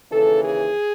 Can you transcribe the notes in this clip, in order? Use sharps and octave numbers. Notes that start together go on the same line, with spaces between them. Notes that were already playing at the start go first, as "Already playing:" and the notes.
D#2 C#3 E3 A4
G#4